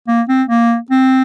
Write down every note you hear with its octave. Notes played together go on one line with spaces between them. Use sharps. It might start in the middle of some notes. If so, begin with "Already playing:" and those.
A#3
C4
A#3
C4